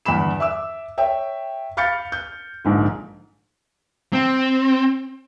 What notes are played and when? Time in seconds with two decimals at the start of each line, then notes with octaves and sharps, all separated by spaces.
0.06 E2 G2 D3 B5 E7
0.40 E5 D6 E6
0.98 C#5 E5 G5
1.77 F5 B5 F6 G6 A6 C#7
2.12 G6
2.65 A#1 G#2 D3
4.13 C4